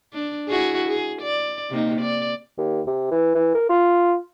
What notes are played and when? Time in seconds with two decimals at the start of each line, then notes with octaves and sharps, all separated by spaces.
0.13 D4
0.48 E4 F#4 G#4
0.88 G#4
1.22 D5
1.70 C3 A#3 D#4
2.01 D5
2.57 D#2
2.86 C3
3.11 E3
3.35 E3
3.54 A#4
3.69 F4